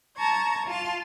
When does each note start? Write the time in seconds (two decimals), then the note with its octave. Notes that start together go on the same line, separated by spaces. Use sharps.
0.16 A5 A#5 C#6 G#6
0.65 F4 A5